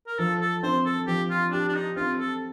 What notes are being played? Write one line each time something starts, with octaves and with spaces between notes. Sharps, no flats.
A#4
F3 A4
A4
C4 C5
A4
F3 G4
F4
D4 G4
D4
D#4
C4 F4
A4